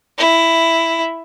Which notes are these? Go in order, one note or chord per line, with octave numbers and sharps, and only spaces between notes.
E4